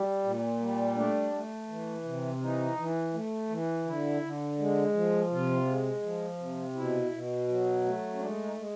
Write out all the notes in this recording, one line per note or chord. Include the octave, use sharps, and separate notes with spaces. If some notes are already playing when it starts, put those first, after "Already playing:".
Already playing: G3
A#2
G3
A3 D4
A3
E3
C3
E3 D#4
E3
A3
E3
D3 E4
D3
G#3
F3
C3 F4
G#3
F3
C3
B2 E4
B2
F#3
A3
C#4
G#3 D4
D#4
G#3